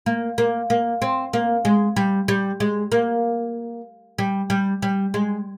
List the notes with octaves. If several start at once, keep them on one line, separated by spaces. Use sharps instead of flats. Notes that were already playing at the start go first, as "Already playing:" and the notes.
A#3
A#3
A#3
C4
A#3
G#3
G3
G3
G#3
A#3
G3
G3
G3
G#3